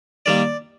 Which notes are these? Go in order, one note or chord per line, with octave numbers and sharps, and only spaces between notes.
D#3 G3 A#3 D5